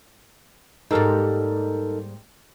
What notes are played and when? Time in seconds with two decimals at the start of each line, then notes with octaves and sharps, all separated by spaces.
0.91 G#2 G3 A#3 D#4 A4 A#4